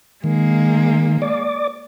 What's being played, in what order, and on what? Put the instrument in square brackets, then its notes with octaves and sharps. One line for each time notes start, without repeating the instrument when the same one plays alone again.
[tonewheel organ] D#3 [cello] G#3 A#3
[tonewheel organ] D5 D6